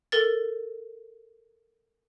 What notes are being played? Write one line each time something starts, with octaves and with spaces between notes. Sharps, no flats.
A4 A#4 A6